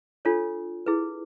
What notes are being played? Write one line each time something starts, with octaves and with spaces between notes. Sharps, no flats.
D4 F4 A4 C#5
E4 G#4 B4